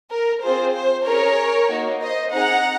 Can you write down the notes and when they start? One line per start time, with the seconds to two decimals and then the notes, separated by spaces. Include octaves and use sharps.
0.10 A#4
0.43 C4 F4 G#4 C5
0.74 C5
1.06 C#4 G#4 A#4 C#5
1.70 A#3 D#4 F#4
2.01 C5 D#5
2.33 C4 D#4 G#4 F#5 A#5